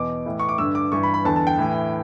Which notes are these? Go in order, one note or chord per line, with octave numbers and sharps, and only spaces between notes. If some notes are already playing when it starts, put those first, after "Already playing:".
Already playing: E2 B2 D6
A2 E3
C#6
D6
G2 D3 E6
D6
G2 E3 C#6
B5
B5
E2 D3 A5
A5
G5
A2 E3